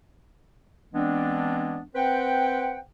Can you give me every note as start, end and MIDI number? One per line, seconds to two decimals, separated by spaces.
0.94 1.80 52
0.94 1.80 56
0.94 1.80 59
0.94 1.80 60
0.94 1.80 62
1.96 2.79 60
1.96 2.79 71
1.96 2.79 72
1.96 2.79 78
1.96 2.79 79